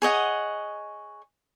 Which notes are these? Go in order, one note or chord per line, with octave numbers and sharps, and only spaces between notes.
G#4 C#5 D#5 F#5